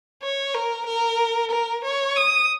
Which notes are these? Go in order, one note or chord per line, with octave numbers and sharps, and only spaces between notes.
C#5
A#4
A#4
A#4
C#5
D#6